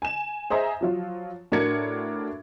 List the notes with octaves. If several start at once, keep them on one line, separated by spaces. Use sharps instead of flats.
G#5 E7
G#4 C5 D#5 E5 A#5
F3 F#3 F4
A2 D4 F#4 A#4 G#6 C#7